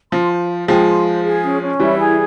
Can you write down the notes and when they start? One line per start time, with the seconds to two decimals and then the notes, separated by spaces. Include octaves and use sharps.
0.12 F3 C6
0.31 C5
0.49 C5
0.68 F3 G#3 G5
0.87 C6
1.06 C5
1.24 G#4
1.43 C#4
1.61 C#4
1.80 E3 G3 E4
1.99 G#4